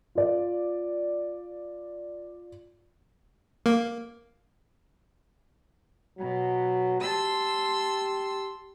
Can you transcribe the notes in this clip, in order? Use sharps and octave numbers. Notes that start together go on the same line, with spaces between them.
F4 D5
A#3
B2 F#3
G4 A5 C6 E6